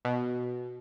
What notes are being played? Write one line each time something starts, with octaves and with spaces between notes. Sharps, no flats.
B2